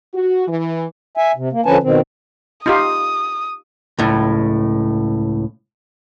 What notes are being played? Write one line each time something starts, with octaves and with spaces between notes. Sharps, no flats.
F#4
E3
E5 G#5
C3
A#3
D3 F3 C#4 B4 G#5 A5
B2 D#3 C4
D#4 F4 G4 D#6
C#2 A2